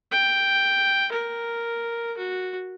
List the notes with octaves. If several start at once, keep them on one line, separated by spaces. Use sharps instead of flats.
G5
A#4
F#4